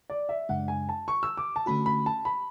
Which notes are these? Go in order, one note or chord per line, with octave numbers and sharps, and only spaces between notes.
D5
E5
F#2 C#3 G#3 D4 F#5
G#5
A5
C#6
E6
D6
A5
D3 A3 C#4 F#4 B5
B5
A5
B5